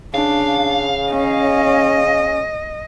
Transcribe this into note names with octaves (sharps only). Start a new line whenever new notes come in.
C#3 D4 F5
C#4 D#5